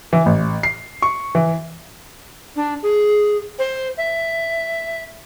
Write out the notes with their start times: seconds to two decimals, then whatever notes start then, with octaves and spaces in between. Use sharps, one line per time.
0.13 E3
0.26 A1
0.63 C7
1.02 C#6
1.35 E3
2.56 D4
2.83 G#4
3.59 C5
3.98 E5